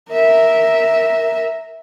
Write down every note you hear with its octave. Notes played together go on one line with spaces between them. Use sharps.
A#4 E5